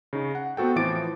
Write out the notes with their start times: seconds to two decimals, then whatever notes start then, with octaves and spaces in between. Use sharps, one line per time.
0.13 C#3 D#4
0.35 F#5
0.57 B3 C4 F#4 A4 G5
0.76 A2 E3 F3 D6 A6 D7